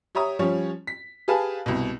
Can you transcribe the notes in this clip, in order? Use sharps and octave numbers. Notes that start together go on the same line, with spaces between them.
G4 C#5 E5 A#5 D#6
F3 G3 C#4 C#5
B6
G4 G#4 B4 F5 G#5 A5
C2 B2